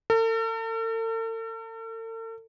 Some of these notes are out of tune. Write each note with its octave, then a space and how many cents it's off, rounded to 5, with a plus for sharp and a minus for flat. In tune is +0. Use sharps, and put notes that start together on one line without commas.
A4 +45